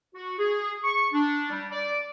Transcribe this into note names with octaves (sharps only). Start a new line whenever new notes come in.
F#4
G#4
C#6
D4
G3
D5